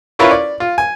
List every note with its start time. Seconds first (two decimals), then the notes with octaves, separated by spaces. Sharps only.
0.19 C#4 E4 F4 A#4 B4 C#5
0.31 D5
0.60 F4
0.78 G#5